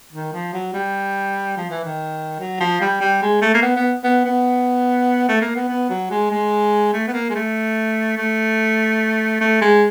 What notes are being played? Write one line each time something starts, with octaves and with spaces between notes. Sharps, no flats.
D#3
F3
F#3
G3
F3
E3
D#3
F#3
F3
G3
G3
G#3
A3
A#3
B3
B3
B3
B3
A3
A#3
B3
B3
F#3
G#3
G#3
A3
B3
A#3
G#3
A3
A3
A3
G#3